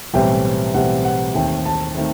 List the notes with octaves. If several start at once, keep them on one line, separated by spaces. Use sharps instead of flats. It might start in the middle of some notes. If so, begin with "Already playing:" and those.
B1 A2 E3 G3 C4 G5
B1 A2 E3 G3 C4 F#5
F#5
D#2 D#3 A3 C4 G5
A5
D#3 A3 C4